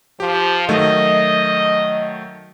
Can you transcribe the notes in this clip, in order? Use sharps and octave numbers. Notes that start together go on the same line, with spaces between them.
F3 G4
D#3 F#3 A3 D#5